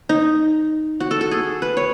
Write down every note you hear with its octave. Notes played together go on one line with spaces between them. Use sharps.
D#4
F#4
A4
A4
G#4
B4
C#5